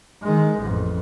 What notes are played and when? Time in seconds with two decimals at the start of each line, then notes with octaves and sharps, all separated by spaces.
0.22 D#3 G#3
0.58 A1 F2